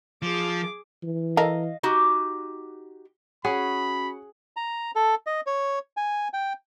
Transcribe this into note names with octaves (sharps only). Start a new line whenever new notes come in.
F3 G#4 D6
E3
A4 A#4 D#5 F5
D#4 F#4 G4
C#4 F#4 G#4 C#5 F#5 B5
A#5
A4
D#5
C#5
G#5
G5